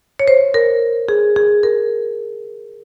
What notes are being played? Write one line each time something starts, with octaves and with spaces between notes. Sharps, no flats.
C#5
C5
A#4
G#4
G#4
A#4